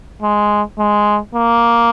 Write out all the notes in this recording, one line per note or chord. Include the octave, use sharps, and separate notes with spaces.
G#3
G#3
A#3